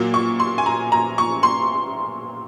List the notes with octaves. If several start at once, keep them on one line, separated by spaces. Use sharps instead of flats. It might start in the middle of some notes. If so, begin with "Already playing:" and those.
Already playing: A#2 F#3 A#3
C#6
C6
G#5
A#5
A#5
C#6
C6